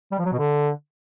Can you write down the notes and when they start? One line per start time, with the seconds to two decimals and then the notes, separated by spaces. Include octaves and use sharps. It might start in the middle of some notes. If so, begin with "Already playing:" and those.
0.12 G3
0.18 F3
0.25 F#3
0.32 B2
0.39 D3